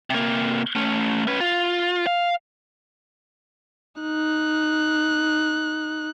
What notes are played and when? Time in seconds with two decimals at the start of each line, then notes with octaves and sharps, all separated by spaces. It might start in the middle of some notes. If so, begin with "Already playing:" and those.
0.10 C3 A#3
0.76 A3 C#4
1.27 C#4 B4
1.40 F4
2.07 F5
4.02 D#4 F#6